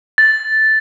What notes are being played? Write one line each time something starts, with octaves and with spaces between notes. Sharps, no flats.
A6